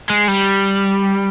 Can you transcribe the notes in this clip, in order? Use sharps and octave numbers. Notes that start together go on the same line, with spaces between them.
G#3
G3